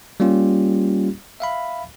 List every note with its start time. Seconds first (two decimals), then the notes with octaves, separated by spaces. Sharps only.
0.20 G3 A#3 C#4 F4 G4
1.40 E5 F5 B5